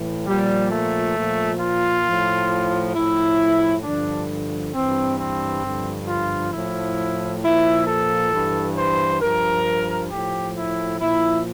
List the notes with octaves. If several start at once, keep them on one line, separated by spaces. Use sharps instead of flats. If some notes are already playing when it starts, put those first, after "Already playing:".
Already playing: A2 E3
A#2 F3 G3
A3
A#2 F3
F4
A2 F3
A2 F3 E4
G2 D3 F3 D4
G2 E3 C4
C4
G2 D3 F3
F4
A2 F3 E4
A#2 F3 E4
A4
G2 E3
C5
G2 F3 A#4
A2 G4
F3
E4
A#2 F3 E4